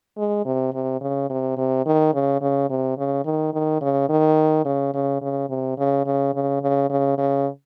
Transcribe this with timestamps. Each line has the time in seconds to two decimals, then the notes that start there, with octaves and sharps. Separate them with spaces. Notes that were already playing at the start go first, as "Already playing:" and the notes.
0.18 G#3
0.45 C3
0.73 C3
1.01 C#3
1.30 C3
1.57 C3
1.86 D#3
2.14 C#3
2.41 C#3
2.70 C3
2.98 C#3
3.25 D#3
3.53 D#3
3.81 C#3
4.09 D#3
4.65 C#3
4.94 C#3
5.21 C#3
5.49 C3
5.78 C#3
6.06 C#3
6.34 C#3
6.62 C#3
6.90 C#3
7.18 C#3